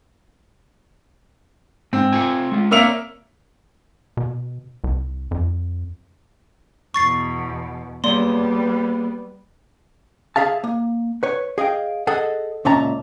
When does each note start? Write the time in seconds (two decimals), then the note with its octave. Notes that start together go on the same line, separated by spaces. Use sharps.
1.93 G#2 C4
2.12 A3 F4 G#5
2.52 G#3 F4
2.71 A#3 C4 C#5 D5 E5 F7
4.17 B2
4.84 C2
5.31 F2
6.94 E2 B2 C#6 A6 C7
8.04 G3 A#3 B3 G#4 C#5 D5 C6
10.36 G#4 E5 F5 A5
10.64 A#3
11.23 B4 C#5
11.58 G#4 D#5 F5 G5
12.07 G#4 A4 D#5 F#5
12.65 C#2 A#2 C#4 E5 A5 A#5